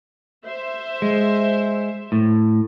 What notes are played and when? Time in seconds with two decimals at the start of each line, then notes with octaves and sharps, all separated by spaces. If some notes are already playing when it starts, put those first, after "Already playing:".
0.45 C5 E5
1.02 G#3
2.12 A2